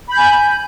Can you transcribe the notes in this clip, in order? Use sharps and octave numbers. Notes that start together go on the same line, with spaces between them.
G#5 B5 G6